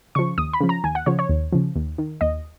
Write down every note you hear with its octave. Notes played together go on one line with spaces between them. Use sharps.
C#3 F3 C#6
D#2 D#6
B5
C#3 F3
A#5
D#2 G#5
F#5
C#3 F3 C#5
C#5
D#2
C#3 F3
D#2
D#3
D#2 D#5